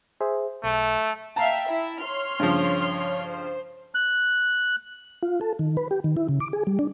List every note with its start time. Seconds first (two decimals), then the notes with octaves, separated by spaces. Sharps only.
0.20 G#4 C5 E5
0.64 B1 A3
1.36 E5 F5 G5 A5 A#5
1.66 E4 E5
2.00 C#5 C6 F6
2.39 G2 C#3 F3
3.26 C5
3.95 F#6
5.23 F4
5.41 A4
5.59 D#3
5.77 B4
5.91 G4
6.04 D#3
6.17 E4
6.28 C#3
6.40 D6
6.53 G#4
6.67 G3
6.79 D4